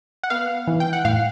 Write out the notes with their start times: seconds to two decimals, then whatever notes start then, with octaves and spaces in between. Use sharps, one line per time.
0.23 F#5
0.30 B3 F5
0.67 E3
0.80 G5
0.93 F#5
1.05 A2 F5